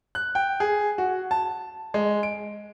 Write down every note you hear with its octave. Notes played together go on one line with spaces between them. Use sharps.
F#6
G5
G#4
F#4
A5
G#3
D7